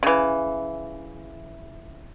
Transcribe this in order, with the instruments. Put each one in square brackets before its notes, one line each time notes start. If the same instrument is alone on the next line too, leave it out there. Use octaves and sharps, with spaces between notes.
[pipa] C#3 E3